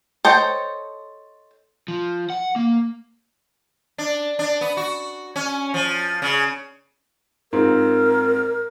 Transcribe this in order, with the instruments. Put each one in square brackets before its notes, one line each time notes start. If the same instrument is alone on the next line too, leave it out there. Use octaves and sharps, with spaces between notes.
[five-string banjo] A4 C5 C#5 D#5 G5
[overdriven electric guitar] F3
F#5
A#3
[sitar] D4
D4
B3
F#4
C#4
F3
C#3
[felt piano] G#2 C4 F4 [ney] A#4